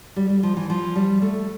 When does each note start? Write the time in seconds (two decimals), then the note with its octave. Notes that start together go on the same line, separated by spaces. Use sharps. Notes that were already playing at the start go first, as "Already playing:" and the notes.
0.16 G3
0.30 G3
0.43 F3
0.57 E3
0.70 F3
0.95 G3
1.22 A3